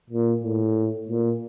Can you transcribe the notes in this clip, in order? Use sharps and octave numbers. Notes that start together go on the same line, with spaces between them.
A#2
A2
A#2